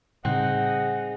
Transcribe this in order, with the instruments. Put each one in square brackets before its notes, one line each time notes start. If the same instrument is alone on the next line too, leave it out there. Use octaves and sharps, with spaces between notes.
[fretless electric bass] A2 C#3 G3 [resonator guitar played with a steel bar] C4 [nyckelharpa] D#4 G#4 [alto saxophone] F#5